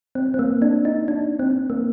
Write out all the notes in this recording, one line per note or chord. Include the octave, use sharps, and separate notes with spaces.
C4
C4
A#3
D4
D#4
D4
C4
A#3